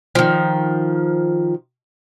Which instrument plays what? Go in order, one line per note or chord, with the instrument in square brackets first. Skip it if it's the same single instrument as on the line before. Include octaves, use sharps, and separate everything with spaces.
[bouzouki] D#3 F3